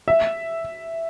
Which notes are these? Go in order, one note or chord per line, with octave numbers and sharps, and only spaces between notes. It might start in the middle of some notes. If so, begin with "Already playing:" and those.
E5